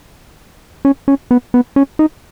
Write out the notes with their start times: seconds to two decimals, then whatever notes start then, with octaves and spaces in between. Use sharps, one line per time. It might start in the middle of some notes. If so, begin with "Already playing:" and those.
0.85 C#4
1.08 C#4
1.31 B3
1.54 B3
1.76 C#4
1.99 D#4